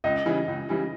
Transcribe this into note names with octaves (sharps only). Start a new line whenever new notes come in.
C#2 D#5
C#3 E3 G3
C#2
C#3 E3 G3